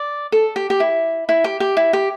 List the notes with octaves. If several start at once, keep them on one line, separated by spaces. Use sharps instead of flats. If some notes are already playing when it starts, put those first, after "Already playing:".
Already playing: D5
A4
G4
G4
E4
E4
G4
G4
E4
G4